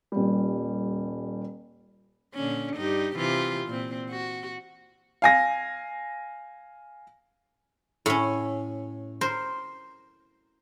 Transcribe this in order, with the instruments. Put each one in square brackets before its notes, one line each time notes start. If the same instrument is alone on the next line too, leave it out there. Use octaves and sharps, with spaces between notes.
[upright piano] D#1 G3
[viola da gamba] A#2 D3 C#4
G2 D#4 G4
C3 E3 F4
A#2 C4
F#4
[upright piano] F5 G#5 A#6
[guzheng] A2 C#4
A#4 C5